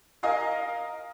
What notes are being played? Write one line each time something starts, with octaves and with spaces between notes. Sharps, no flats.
A#4 D#5 F5 G#5